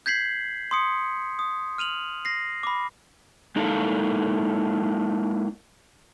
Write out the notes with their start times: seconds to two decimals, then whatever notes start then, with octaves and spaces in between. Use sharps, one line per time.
0.06 G6 G#6 B6 C7 F#7
0.71 C6 D#6 C#7
1.39 D#6
1.78 F6 D#7 F7 F#7
2.25 A#6 C7
2.63 B5 D6
3.56 G#3 A#3 D#4 E4 A4 F5